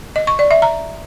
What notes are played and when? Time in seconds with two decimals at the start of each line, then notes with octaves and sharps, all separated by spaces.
0.16 D#5
0.27 C#6
0.39 D5
0.51 E5
0.62 A#5